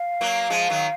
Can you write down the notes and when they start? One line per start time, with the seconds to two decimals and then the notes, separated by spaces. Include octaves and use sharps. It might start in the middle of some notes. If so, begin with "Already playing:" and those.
Already playing: F5
0.21 F#3 A#3
0.50 F3 G#3
0.70 D#3 F#3